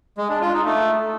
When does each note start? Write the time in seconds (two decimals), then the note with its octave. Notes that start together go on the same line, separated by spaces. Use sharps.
0.17 G#3
0.29 D4
0.41 F4
0.53 D#4
0.65 A3